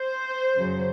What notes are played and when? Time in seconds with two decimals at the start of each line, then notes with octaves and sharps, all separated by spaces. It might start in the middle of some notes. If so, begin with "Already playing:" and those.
Already playing: C5
0.57 F#2 C#3 F#3